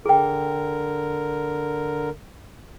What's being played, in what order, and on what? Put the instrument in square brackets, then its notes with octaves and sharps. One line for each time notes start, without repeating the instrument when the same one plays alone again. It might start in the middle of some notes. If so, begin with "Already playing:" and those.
[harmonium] D3 A#4 [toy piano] G#4 G5